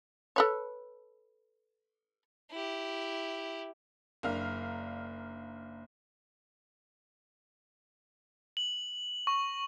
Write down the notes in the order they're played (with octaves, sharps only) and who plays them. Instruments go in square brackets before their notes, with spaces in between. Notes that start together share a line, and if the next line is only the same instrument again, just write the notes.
[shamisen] A4 B4 C#5
[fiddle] E4 G4
[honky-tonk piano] F#1 D4 A#4 F5 F6
[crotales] F#7
C#6